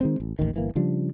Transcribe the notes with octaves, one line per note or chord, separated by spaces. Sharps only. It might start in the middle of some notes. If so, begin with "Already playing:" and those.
D#3 G#3 C4
A1
A1 D#2 D#3
G1 E3 A#3
C#3 F3 G3 D4